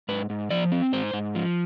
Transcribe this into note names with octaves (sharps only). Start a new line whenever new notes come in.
G#2 B4
G#2
F3 D5
C4
G#2 C5
G#2
F3